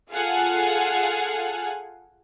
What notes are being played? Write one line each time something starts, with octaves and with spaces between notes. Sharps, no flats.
F4 G#4 A4 F5 F#5 G#5